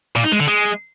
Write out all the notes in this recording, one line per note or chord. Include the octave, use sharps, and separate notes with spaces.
A#2
D#4
G#3
D3
G#3